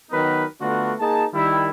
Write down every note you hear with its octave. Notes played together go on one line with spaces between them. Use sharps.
D#3 F#3 B3 D#4 A#4 B4
D3 A3 B3 D4 F4 F#4
A#3 D#4 G#4 A5
D#3 G3 E4